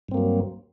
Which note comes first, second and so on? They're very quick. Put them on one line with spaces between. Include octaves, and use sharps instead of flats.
G2 C4 A#3 F#3